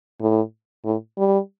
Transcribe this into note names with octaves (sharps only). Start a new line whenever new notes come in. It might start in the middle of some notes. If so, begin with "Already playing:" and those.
A2
A2
G3